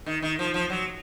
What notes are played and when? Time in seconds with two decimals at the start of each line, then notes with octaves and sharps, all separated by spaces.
0.06 D#3
0.22 D#3
0.39 F3
0.54 F3
0.70 F#3